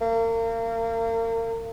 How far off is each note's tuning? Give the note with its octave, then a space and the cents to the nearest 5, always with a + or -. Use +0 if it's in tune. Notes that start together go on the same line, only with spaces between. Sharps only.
A#3 -35